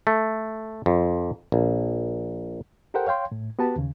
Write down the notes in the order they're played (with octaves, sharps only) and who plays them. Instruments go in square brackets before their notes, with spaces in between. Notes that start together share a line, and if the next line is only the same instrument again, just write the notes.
[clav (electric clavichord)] A3
F2
A#1
[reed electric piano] G4 A4 A#4 C5 F#5 G5
C#5 F5 G5 C6
A2
B3 F#4 G4 B4 A5
D#2 C#3